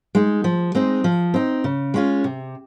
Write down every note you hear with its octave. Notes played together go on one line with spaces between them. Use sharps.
G#3 D#4
F3
G#3 C4 D#4
F3
C4 D#4
C#3
G#3 C#4 F4
C3